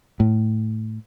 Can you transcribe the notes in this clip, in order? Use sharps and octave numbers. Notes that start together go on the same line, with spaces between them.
A2